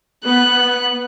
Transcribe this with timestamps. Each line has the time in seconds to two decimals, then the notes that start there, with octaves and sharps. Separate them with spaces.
0.25 B3 F#6